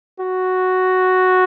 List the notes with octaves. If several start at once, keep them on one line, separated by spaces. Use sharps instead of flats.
F#4